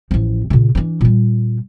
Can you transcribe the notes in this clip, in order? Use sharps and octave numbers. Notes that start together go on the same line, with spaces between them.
A1 F3
A#2 C#3
E3 D4
A#2 G3